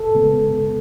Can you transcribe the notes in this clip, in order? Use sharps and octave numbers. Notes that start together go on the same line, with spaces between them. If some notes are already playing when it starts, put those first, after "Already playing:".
Already playing: A4
C#3 G#3 B3